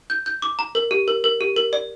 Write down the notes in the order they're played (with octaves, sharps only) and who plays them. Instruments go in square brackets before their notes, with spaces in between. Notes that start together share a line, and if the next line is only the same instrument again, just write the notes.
[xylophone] G6
G6
D6
A#5
A#4
G4
A#4
A#4
G4
A#4
D5